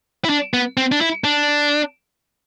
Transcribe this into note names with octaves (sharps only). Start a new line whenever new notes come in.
E4
D4
B3
C4
D4
E4
D4